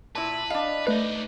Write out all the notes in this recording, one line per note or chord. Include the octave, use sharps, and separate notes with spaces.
A#2 E4 B4 A5
D4 D#5 F5
A3 D#4 B4 D5